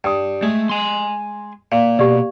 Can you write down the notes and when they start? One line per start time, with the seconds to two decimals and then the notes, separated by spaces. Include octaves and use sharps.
0.04 G2 G5 D#6
0.43 G#3 A3
0.69 G#5 C6
1.72 A#2 F5
1.99 B2 G4 D5